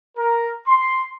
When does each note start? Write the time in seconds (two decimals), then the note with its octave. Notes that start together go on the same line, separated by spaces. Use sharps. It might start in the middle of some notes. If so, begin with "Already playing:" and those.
0.16 A#4
0.66 C6